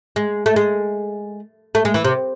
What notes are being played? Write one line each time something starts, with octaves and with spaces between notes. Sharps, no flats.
G#3
A3
G#3
A3
G#3
E3
C3